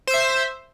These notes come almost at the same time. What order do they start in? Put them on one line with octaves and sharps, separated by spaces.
C5 E6 E5